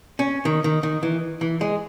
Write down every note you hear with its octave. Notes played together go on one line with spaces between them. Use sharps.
C#4
D#3
D#3
D#3
E3
E3
G#3